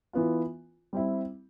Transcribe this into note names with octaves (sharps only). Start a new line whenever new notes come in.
E3 B3 F4
G3 C4 E4